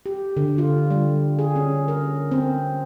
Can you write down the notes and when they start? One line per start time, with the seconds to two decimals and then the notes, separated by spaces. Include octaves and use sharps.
0.06 G4
0.37 D3
0.58 F4
0.91 G3
1.39 G#4
1.56 C#4
1.88 A#4
2.31 C4